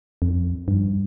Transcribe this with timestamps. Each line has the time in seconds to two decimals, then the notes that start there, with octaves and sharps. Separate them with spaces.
0.22 F2
0.68 G2